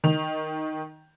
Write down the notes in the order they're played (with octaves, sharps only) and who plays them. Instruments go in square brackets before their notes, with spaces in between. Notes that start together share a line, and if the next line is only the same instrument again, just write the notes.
[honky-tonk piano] D#3 F7